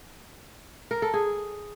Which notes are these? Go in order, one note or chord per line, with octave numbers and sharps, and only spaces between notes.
A#4
A4
G#4